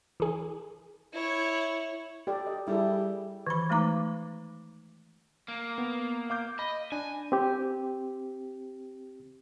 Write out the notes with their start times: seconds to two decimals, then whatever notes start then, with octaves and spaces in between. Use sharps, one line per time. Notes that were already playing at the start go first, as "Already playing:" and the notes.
0.20 E3 G#4
1.13 E4 C#5
2.27 G4 A4 D5
2.47 D#5
2.68 G3 E4 G#4 A4
3.47 D#3 E3 B5
3.70 E3 G#3 A3 D#4 A#5 D6
5.48 A#3
5.78 B3
6.30 F5 D6 G6
6.59 D#5 B5
6.92 D4 G#5
7.32 C4 G4